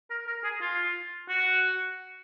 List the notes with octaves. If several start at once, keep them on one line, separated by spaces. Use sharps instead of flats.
A#4
A#4
G#4
F4
F#4